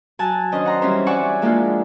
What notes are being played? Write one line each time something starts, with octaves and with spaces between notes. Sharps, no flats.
F#3 G#5 A5 F#6
D#3 C#4 D4 C5 D#5
F#5 A#5 C6
E3 G3 C4 C#4 C5
D5 E5 F#5 G#5 C#6 D6
F3 G#3 A#3 D4 E4 F4